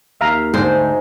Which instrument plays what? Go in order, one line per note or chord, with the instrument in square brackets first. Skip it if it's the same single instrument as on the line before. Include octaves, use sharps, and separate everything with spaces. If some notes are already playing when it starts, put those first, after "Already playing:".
[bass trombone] D#2 [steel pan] E5 F5 A#5
[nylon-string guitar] D2 C5 [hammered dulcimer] G#2